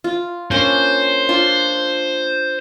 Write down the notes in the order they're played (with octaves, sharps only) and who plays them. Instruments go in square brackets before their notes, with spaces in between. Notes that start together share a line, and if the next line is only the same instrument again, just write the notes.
[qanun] F4
[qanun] A#3 C#4 D4 [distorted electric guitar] C5
[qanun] D4 F4